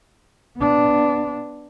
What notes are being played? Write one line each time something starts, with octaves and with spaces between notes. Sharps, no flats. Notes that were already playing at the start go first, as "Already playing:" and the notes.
B3 D4